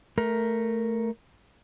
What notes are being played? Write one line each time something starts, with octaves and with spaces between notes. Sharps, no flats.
A3 A#4